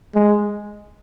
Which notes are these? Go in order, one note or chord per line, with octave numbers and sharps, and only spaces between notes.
G#3